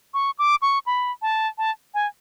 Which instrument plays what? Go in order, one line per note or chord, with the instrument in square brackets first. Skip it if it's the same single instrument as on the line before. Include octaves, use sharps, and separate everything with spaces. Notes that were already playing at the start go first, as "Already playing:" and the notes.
[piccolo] C#6
D6
C#6
B5
A5
A5
G#5